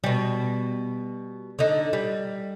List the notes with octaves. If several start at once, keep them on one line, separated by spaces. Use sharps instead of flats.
B2 G3
D3 D#4
G3